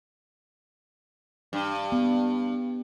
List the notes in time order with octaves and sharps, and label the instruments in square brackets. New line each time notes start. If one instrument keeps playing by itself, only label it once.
[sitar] G2
[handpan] B3